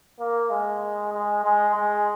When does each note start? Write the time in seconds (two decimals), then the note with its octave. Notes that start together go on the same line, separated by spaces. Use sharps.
0.19 A#3
0.50 G#3
1.13 G#3
1.44 G#3
1.75 G#3